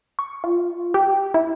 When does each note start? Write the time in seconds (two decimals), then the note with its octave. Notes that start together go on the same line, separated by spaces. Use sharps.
0.19 C#6
0.44 F4
0.94 G4
1.34 E4